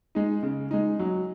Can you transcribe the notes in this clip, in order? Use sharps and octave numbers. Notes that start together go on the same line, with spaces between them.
G#3 D#4
C#3
G#3 D#4
F#3